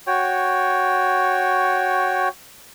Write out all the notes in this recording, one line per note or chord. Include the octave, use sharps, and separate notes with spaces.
F#4 C#5 G5